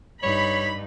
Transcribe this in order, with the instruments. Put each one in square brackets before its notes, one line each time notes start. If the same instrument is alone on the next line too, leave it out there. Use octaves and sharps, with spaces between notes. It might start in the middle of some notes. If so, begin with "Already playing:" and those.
[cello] G2 D#4 [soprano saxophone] C#5 [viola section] B5